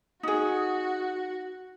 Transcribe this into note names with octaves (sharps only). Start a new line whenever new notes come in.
D#4 F#4 G#4 F#5